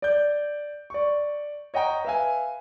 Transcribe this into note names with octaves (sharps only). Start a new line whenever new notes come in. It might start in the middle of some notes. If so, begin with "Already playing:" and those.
D5 G6
D5 C#6
C#5 D#5 F#5 G5 A#5
B4 E5 F5 G#5